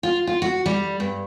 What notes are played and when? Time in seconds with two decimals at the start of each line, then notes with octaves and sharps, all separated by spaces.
0.03 F4
0.27 F4
0.42 F#4
0.66 G3
1.00 G2